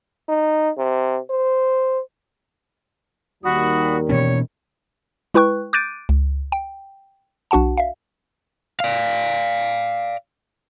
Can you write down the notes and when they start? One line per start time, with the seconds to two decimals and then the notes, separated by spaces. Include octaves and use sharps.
0.29 D#4
0.78 C3
1.30 C5
3.44 D#2 D#3 G3 F#4 B5 D#6
4.09 B2 E3 C#4 C#5
5.34 G#3 E4 B4 G5 C#6 F#6
5.73 D6 F#6 G6 A6 D7 D#7
6.09 C#2
6.52 G5
7.51 B1 D4 F#4 F#5 A5
7.78 E5 F5
8.80 D5 F5